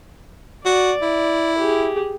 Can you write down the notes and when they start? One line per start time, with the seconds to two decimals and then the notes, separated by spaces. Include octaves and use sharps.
0.66 F#4 D5
1.02 E4
1.58 G4 G#4